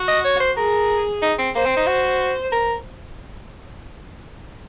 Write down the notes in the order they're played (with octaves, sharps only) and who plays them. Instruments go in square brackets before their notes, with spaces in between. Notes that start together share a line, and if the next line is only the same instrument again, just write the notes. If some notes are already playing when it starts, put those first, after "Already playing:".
Already playing: [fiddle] F#4
[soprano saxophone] D#5
C#5
C5
[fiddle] G#4 [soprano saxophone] A#4
[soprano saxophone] D#4
C4
[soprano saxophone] A#3 [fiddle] C5
[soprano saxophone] C4
D#4
F#4
A#4